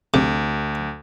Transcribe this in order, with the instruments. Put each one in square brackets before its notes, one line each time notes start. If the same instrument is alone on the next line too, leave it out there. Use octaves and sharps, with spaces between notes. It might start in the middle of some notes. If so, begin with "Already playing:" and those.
[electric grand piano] D2 [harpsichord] C3